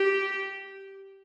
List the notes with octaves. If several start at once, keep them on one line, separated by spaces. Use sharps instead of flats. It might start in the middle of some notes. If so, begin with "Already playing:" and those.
Already playing: G4